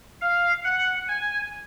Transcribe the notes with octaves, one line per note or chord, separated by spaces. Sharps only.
F5
F#5
G#5